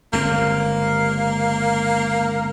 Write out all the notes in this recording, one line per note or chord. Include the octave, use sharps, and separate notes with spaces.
G1 C#2 A#3 C4